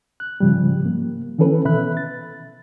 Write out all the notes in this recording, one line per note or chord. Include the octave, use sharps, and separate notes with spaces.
F#6
G#2 C#3 F3 G3
A#3
D#3 E3 C#4 A4 B4
B2 E5 B5 F#6
A6